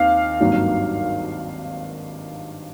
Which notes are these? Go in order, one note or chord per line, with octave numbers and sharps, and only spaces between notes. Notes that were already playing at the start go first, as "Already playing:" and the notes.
Already playing: D#2 D#3 C4 F5
G#1 G2 D#3 F#3 A#3